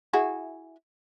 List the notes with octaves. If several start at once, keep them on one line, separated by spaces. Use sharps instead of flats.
E4 F#4 G#4